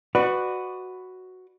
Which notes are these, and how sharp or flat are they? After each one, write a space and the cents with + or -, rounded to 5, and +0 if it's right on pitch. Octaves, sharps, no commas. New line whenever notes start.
F#4 +0 B4 +10 D5 +30